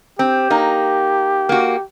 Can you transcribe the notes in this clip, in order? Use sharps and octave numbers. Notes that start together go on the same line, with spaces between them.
C4 G4
A#3 D#4
A#3 F#4